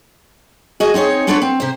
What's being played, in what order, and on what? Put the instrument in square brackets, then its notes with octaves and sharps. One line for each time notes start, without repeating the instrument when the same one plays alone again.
[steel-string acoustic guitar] F#4 G#4 D#5
C4 D#4 G#4 C#5
B3 D4 F4 A4 B4 C#5
C4
C3 C5